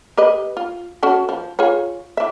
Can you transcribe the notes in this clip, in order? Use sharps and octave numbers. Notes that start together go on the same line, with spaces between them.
G4 B4 D#5
F4
C#4 F#4 A4
F3
F4 G#4 C#5
E3 E5